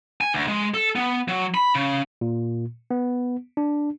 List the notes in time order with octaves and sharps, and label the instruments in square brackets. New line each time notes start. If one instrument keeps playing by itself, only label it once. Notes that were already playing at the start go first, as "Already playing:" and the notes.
[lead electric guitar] G#5
D2
G#3
A4
B3
F#3
B5
C#3
[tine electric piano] A#2
B3
D4